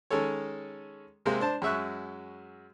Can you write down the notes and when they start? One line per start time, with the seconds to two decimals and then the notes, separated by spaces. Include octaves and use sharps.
0.10 D#3 G#3 C#4 A4 C#5
1.26 C3 G#3 A#3 C4
1.40 D4 C5 A5
1.62 F#2 G#3 E5 C#6 F#6